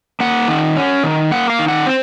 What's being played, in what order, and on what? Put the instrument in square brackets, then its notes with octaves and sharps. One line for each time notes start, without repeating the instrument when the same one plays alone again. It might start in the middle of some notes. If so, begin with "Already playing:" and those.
[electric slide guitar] A#3 F#5
D#3
C#4
D#3
A#3 F#5
F5
D#3
F#5
C4 C5